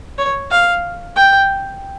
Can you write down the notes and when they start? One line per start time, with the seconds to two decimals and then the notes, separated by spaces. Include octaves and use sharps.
0.18 C#5
0.50 F5
1.16 G5